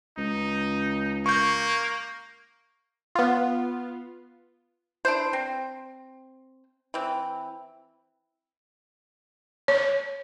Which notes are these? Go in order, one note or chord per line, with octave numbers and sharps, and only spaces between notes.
C#2 D#4
A#3 C#6 G6
B3 F4
D4 E4 C5
C4
E3 C4
C#5